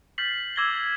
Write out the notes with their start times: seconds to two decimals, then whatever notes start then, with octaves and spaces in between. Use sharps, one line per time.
0.18 F6 G6 A6 B6 C7 F#7
0.56 D6 E6 G#6 A#6 F#7 G7